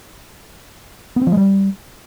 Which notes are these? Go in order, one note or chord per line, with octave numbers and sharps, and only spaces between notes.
B3
C4
F3
G#3
G3